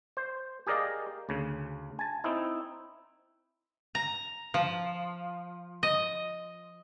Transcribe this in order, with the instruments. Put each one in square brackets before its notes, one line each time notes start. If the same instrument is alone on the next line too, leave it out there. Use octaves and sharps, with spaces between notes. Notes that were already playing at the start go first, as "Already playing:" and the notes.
[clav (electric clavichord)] C5
G4 G#4 A#4 D5 D#5 F5
D2 C#3
G#5 A5
C4 D#4 E4
[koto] A#5
F3
D#5